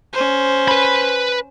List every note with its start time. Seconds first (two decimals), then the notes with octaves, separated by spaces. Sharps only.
0.13 C#4 C5
0.68 B4 B5